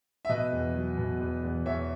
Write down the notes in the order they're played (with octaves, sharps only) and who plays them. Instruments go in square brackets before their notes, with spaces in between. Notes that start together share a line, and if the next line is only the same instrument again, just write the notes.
[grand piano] E5
B2 B4 D#5
E2
F#3
B2
E2
E2
E2 C#5 E5